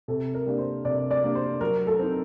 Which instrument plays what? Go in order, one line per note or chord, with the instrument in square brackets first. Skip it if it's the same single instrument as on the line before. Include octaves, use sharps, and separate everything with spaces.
[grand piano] C3 [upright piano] A4
[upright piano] A#4
[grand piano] G3 A#3 D4
[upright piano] C5
[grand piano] C3 [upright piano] D5
[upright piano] D5
[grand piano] G3 A#3 D4
[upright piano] C5
[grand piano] F#3 [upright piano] A#4
[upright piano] A4
[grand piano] C4 D#4